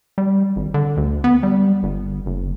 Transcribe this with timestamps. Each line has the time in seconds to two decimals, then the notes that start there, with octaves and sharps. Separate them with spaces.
0.18 G3
0.56 G#1
0.74 D3
0.97 D2
1.24 B3
1.43 G3
1.83 G1
2.26 F#1